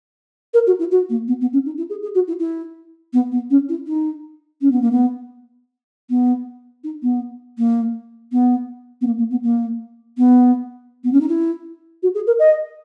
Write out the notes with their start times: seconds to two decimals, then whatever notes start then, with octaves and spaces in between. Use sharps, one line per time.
0.54 A#4
0.67 F#4
0.79 E4
0.91 F#4
1.10 A#3
1.28 B3
1.41 B3
1.53 C#4
1.66 D#4
1.78 E4
1.90 G#4
2.02 G#4
2.15 F#4
2.28 E4
2.39 E4
3.13 B3
3.32 B3
3.50 C#4
3.69 E4
3.87 D#4
4.61 C#4
4.71 B3
4.82 A#3
4.92 B3
6.10 B3
6.84 D#4
7.03 B3
7.58 A#3
8.32 B3
9.01 B3
9.07 A#3
9.18 A#3
9.31 B3
9.43 A#3
10.18 B3
11.04 B3
11.13 C#4
11.21 D#4
11.28 E4
12.03 F#4
12.15 G#4
12.27 A#4
12.39 D#5